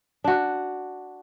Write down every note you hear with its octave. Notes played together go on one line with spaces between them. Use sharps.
D4 F#4